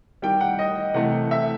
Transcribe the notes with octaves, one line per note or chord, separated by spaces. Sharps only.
D#3 G3 G5
F#5
D#5
C3 E3 A3 F#5
E5